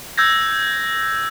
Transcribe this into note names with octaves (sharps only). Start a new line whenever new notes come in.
E6 G6 G#6 A#6